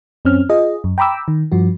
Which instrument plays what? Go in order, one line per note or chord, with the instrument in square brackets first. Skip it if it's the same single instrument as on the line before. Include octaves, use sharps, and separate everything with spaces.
[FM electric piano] F#2 C4 C#4 F6
F4 G#4 D#5
F#2
G5 A#5 B5 D6 E6
D#3
G2 F3 F#4